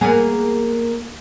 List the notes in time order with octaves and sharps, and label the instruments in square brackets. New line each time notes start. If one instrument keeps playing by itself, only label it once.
[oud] A#3 B3 G#4